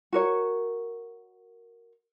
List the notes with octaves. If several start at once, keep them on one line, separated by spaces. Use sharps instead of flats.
F#4 A#4 C#5